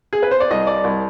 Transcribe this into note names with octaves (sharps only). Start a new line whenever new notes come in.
G#4
B4
C5
D5
C2 D#5
D5
C2